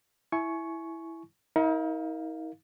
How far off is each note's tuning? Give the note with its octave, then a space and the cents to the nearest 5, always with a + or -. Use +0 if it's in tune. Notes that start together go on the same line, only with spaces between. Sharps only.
E4 +0 G#5 +30 C#6 +0
D#4 +45 A#4 +0 F5 +0